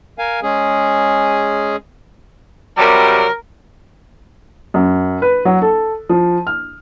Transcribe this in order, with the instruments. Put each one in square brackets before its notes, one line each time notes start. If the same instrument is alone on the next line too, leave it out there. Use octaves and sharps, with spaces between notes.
[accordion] A#4 F5 G#5
G#3 C#4 G#4
[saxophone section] C3 F#3 G3 [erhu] A#4
[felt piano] F#2
B4
F#3
A4
F3
F6